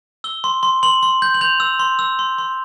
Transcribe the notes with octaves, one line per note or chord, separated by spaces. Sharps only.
E6 G7
C6
C6
C6 F#7
C6
G6
F#7
G6 F7
E6
C6
E6
C6
C6